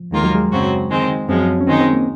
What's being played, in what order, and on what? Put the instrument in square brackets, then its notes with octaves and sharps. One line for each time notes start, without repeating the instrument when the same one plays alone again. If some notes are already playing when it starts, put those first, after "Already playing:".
Already playing: [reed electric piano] F3
[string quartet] D#2 D#3 A#3 F4 A#4 [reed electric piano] G#3
[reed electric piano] F#3
G#3
[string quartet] F#2 C#3 F#3 C4 F#4
D#3 G#3 C4
[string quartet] F#2 F3 G#3 [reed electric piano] C4
[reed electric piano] C#4
[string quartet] D#3 G#3 D#4 [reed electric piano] C4
[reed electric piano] C4
A#3